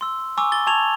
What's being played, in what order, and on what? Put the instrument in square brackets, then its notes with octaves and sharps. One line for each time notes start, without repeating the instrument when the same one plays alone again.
[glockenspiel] C6 E6
G#5 A#5 C#6 D6 E6
A6 G7
A5 C#6 G#6 F7